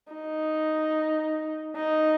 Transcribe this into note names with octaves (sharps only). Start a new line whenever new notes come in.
D#4
D#4